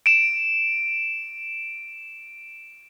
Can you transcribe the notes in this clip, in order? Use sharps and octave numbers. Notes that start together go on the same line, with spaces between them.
D7 E7